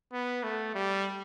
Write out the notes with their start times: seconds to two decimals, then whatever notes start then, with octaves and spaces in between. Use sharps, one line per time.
0.13 B3
0.43 A3
0.75 G3